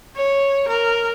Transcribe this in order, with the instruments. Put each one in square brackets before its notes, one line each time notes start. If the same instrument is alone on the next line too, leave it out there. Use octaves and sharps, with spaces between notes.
[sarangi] C#5
A#4